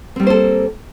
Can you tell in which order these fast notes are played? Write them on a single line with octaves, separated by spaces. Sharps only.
C4 G3 A#3 C5 A4